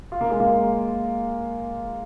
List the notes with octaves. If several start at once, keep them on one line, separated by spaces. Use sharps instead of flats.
F4
A#3
G#3
A#3